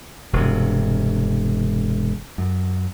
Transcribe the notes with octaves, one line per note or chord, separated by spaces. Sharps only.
E1 G2 C3
F#2